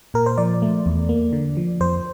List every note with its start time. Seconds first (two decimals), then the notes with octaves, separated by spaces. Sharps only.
0.14 A#2 A#4
0.26 C5
0.38 F3 D5
0.62 A3
0.86 E2
1.09 A#3
1.33 D3
1.57 F3
1.80 F2 C5